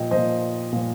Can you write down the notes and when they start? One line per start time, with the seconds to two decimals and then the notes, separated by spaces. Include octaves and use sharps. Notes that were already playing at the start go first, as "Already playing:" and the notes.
Already playing: A#2 F3 D#5 G5
0.11 A#2 F3 C5 D#5
0.72 A#2 F3